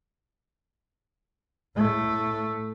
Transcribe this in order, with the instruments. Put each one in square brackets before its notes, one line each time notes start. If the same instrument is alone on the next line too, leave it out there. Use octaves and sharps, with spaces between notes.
[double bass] A2 A3